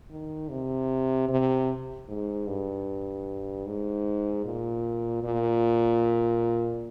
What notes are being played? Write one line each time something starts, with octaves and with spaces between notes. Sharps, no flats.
D#3
C3
C3
G#2
G2
G#2
A#2
A#2